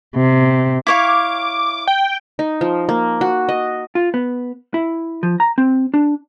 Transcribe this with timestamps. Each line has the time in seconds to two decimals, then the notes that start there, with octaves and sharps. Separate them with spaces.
0.16 C3
0.87 E4 C#5 F5 D6
1.87 G5
2.39 D#4
2.61 F3
2.89 A#3
3.21 F#4
3.49 D#5
3.95 F4
4.14 B3
4.74 E4
5.23 F3
5.40 A#5
5.58 C4
5.94 D4